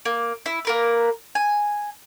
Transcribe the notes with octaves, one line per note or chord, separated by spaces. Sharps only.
A#3
E4
A#3 A#4 B4
G#5